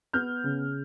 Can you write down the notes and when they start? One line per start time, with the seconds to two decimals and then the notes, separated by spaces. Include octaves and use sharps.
0.13 B3 F6 G6
0.44 C#3